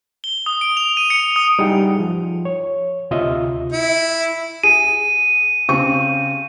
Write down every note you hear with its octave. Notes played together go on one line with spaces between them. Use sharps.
G7
D#6
D7
F7
D#7
C#7
D#6
G3 D#4 E4 G#4 F#5 G5
F3
C#5
D2 C3 F4 D#5 E5
E4
G#4 D#7
C#3 C4 C#6